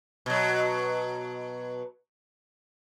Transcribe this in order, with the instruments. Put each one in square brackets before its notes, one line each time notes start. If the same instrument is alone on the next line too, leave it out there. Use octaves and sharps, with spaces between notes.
[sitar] B2 F#3